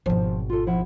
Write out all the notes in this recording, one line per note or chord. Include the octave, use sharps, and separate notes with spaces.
G#1 B2 F3 C5 A5
F4 A4
F3 E4 F#5